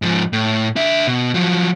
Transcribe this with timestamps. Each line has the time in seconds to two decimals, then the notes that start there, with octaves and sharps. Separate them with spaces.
0.02 G#2 F3
0.33 A2
0.76 D4 E5
1.07 B2
1.34 F3 F#3